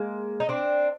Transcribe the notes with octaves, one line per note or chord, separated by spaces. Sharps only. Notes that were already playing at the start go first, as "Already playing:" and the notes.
Already playing: G#3 A#3
D#4
C4 D4